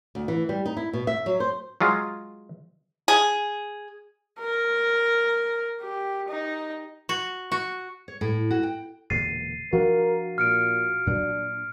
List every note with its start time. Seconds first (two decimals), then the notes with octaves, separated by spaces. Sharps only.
0.15 D2
0.28 E3
0.49 G3
0.66 D#4
0.77 E4
0.93 B2
1.07 E5
1.26 F#3
1.40 C5
1.80 F#3 G#3 F4
3.08 G#4
4.39 A#4
5.81 G4
6.28 D#4
7.09 F#4
7.52 F#4
8.08 C#5
8.21 A2
8.51 F#4
8.63 G5
9.10 E1 A#2 D3 A6 C7 D#7
9.73 F3 D4 F#4 A#4 F5
10.38 A#2 F6 C#7 D7
11.07 A#2 F#3 D4